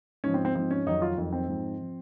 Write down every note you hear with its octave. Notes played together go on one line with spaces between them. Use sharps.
G#2 F3 C#4
C4
C4
G#2 F3 C4
C#4
F2 D#3 F#3 D#4
F4
F2 D#3 F#3
C4
G#2 F3
F3